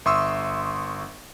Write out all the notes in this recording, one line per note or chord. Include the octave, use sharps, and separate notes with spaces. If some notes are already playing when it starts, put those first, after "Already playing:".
G1 E5 C6 C#6 D#6 E6